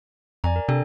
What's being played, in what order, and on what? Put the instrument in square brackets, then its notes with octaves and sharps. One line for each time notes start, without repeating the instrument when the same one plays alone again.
[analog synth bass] F2 [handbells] D5 G#5 A#5
[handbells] A#4
[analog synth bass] C3 [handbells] D4 A4 G5